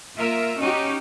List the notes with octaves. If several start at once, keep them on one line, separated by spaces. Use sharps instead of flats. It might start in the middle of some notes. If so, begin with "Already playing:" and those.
A#3 F4 A#4 E5
C#4 D#4 F#4 G4